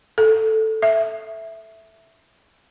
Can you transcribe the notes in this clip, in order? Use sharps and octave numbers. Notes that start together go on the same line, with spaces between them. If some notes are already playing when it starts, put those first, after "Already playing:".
A4
E5